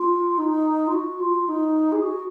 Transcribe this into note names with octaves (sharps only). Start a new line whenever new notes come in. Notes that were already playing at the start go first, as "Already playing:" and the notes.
Already playing: F4
D#4
F4
F#4
F4
D#4
G#4
F#4